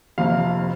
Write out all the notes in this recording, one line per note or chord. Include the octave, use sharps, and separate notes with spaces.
F1 F2 C3 F5